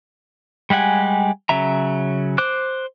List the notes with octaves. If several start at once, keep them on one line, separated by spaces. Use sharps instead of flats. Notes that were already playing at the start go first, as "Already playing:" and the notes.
G3 G#3 G4 F#5 G#5
C#3 F#3 E5 A#5
C5 D6 F#6